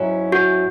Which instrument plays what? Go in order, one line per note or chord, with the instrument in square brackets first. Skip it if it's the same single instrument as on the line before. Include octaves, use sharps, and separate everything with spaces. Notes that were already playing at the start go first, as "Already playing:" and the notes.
Already playing: [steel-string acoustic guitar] G#2 F#3 C#4 E4
[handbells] F#4